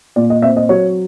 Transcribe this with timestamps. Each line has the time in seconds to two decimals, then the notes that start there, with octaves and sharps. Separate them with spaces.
0.16 A#2 D5
0.30 D#5
0.42 C4 E5
0.57 D#5
0.69 F#3 C#5